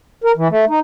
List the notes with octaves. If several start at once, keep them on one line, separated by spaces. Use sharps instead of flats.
A#4
E3
A3
D#4